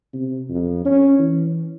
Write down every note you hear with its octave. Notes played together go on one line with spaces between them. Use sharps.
C3
F2
C#4
E3